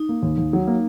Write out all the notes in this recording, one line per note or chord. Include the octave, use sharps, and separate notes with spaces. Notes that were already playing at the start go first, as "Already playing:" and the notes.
Already playing: D#4
A#3
D#2
D#2
F#3
A#3